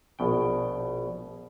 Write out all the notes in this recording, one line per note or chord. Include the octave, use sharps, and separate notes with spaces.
A#1 B2 G5